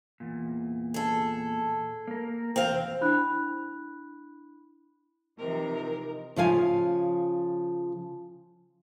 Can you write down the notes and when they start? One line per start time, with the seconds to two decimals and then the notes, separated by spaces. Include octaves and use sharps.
0.20 E2 A#2
0.94 G#4 A4
2.07 A#3 A#4
2.56 E2 C4 F5 G5
3.01 D4 E4 B5 F#6
5.39 C3 E3 F3 D#4 A#4
6.36 C#3 F3 F5 G#5